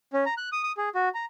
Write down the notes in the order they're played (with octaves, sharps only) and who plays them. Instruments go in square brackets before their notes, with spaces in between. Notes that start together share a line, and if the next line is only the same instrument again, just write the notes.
[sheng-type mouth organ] C#4
A#5
F#6
D#6
D#6
G#4
F#4
A#5